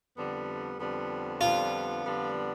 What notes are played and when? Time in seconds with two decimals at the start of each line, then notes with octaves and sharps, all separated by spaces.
0.16 F2 D3 G3 B3
0.78 F2 D3 G3 B3
1.41 F2 D3 G3 B3 F4
2.04 F2 D3 G3 B3